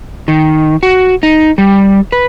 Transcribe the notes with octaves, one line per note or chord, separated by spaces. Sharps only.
D#3
F#4
D#4
G3
B4